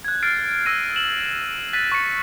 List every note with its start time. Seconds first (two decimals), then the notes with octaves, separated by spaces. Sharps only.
0.04 F#6 G#6
0.23 F6 A6 C7 D7
0.66 E6 F6 A#6 D#7
0.96 E7 F#7
1.73 F#6 A6 B6 D#7
1.92 C#6 C#7